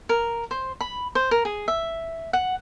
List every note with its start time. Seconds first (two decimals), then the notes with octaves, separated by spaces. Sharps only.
0.09 A#4
0.51 C5
0.81 B5
1.15 C5
1.31 A#4
1.45 G#4
1.68 E5
2.33 F#5